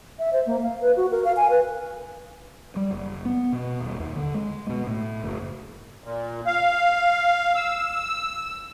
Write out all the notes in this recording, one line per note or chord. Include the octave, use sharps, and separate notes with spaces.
E5
C5
A#3
F5
B4
F#4
A#4
F5
G#5
B4
G3
F#1
B3
B2
D#1
D#2
D3
G#3
B2
A2
F#1
A#2
F5
E6